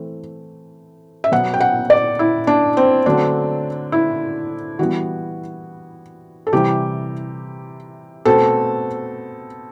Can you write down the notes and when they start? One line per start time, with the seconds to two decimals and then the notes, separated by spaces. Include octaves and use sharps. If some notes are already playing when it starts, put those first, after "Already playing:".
Already playing: E3 A3 C4
1.24 E5
1.32 B2 F#3 B3 F#5
1.54 G5
1.61 F#5
1.90 D5
2.19 E4
2.47 D4
2.77 C4
3.06 D3 F#3 A3 C4 D4
3.92 E4
4.79 E3 G3 B3 F#4
6.47 A4
6.53 C3 E3 G3 G4
8.25 B2 A3 C4 A4